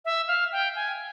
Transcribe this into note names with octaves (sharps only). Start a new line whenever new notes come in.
E5
F5
G5
G#5